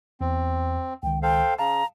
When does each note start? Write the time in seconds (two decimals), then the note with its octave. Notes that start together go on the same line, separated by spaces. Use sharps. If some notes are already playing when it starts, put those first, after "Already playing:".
0.21 E2 C4
1.03 C#2 D#3 G5
1.23 A4 C5 F5 G5
1.59 C#3 F5 A5 A#5